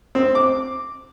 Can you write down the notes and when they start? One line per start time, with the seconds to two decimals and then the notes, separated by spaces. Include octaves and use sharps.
0.15 C4
0.35 D6